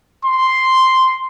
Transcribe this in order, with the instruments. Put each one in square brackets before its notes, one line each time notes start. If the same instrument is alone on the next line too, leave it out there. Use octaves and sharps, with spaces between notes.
[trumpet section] C6